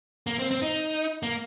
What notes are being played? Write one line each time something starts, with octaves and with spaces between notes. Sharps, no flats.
A#3
C4
C4
D#4
A#3